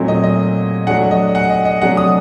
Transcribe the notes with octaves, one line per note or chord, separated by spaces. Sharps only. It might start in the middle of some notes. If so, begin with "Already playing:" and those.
Already playing: A#2 F#3 A3 C4 D#4
D#5
D#5
F#3 A3 D4 F#5
D#5
F#5
D#5
D#5
C3 F#3 A3 D4 F#5
D#6